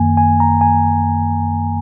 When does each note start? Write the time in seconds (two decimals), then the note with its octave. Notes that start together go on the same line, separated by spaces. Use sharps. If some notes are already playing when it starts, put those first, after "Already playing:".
Already playing: F#2 D#3 A#3 G#5
0.17 G#5
0.40 A#5
0.61 G#5